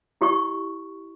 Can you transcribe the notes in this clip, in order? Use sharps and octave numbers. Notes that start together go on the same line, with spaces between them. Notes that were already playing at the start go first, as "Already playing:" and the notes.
E4 G4 D#5 C#6